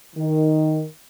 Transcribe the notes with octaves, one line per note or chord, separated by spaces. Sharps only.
D#3